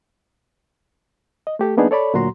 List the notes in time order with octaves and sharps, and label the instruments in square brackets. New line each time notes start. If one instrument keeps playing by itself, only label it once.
[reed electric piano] D#5
A3 G4 A4
F#3 A#3 B3 D4 D#4 G#4
A4 C#5 D5 B5
D2 A#2 F#3 F#4 A#5 C6